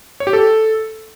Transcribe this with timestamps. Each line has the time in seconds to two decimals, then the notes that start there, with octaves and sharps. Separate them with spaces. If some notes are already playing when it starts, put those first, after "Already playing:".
0.20 C#5
0.27 G4
0.33 A4